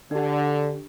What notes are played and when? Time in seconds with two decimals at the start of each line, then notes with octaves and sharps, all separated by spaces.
0.11 D3 D4 G4